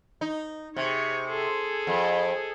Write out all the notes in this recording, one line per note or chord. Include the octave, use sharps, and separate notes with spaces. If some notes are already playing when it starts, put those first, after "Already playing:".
D#4
C3 G#4 C#5
G#4 A4
F2